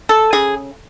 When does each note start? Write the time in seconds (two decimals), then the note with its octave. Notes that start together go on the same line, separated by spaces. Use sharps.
0.09 A4
0.33 C#3 G#4